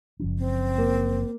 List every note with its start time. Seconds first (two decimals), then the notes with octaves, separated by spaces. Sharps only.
0.19 F#1 F3 C#4
0.38 C4
0.78 A#3